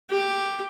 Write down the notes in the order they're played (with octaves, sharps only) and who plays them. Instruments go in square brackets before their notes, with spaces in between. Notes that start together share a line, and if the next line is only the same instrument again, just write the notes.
[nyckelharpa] G4